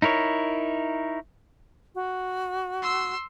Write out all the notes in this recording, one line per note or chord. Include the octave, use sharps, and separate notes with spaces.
D#4 E4 A#4 C#5
F#4
C6 E6